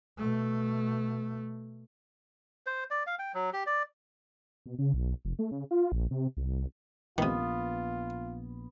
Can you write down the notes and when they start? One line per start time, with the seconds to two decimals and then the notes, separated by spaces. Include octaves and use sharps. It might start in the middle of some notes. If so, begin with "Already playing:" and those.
0.18 B2 A3
2.66 C5
2.91 D5
3.07 F5
3.19 G5
3.34 F#3
3.53 G4
3.66 D5
4.66 B2
4.79 C#3
4.94 B1
5.25 F1
5.39 A3
5.51 C#3
5.71 F4
5.92 A#1
6.11 C3
6.37 C2
7.18 A#1 C3 D#3 B3 F4